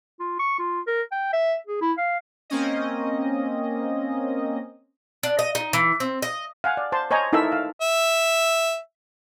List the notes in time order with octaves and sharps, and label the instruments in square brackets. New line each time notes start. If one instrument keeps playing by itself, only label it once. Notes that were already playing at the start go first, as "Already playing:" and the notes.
[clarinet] F4
C#6
F4
A#4
G5
E5
G#4
E4
F5
[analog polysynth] A#3 C4 C#4 D#5
[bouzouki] D4
D#5
D#4
E3
C4
D#5
[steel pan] F5 F#5 G#5
D5
C5 A5 C6
C5 C#5 D#5 G#5 A#5
D#4 E4 A4 A#4 E5 E6
F5
[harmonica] E5